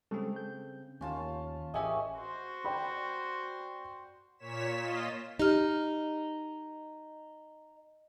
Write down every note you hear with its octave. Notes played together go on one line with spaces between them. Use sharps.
C#3 G3 G#3 C4 A4
G6
D#2 C#4 F4 A5
A1 G4 G#4 C#5 D#5 E5 G#5
F#4 C5
D5 G5 B5
A#2 C#5 B6 E7
F4 D#5
D#4 G4 F6